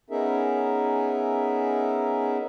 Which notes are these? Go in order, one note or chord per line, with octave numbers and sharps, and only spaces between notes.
B3 C#4 D#4 G#4 A#4 E5